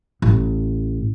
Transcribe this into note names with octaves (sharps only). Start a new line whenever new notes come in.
A1